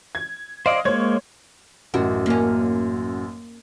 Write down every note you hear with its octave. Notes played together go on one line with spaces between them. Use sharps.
G#6
C5 D5 D#5 F5
G#3 A#3 C5 C#5 G#6
A1 F#2 F#3 F#4
A#3 C#4